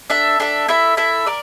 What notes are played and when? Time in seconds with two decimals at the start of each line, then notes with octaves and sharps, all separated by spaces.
0.10 D4 A4 E5
0.40 D4 A4 E5
0.68 E4 A4 E5
0.97 E4 A4 E5
1.26 A#4 D5